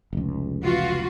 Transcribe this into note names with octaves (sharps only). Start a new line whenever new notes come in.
F1 C#2
E3 F4 F#4